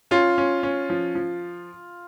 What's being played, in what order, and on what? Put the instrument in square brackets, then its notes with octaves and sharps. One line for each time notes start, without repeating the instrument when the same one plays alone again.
[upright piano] C#4 [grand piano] F4
[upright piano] C#4
C#4
F3
F3